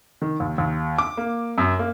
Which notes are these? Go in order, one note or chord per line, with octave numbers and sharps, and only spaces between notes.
D#3
D#2
D#2
D6
A#3
F#2
A#3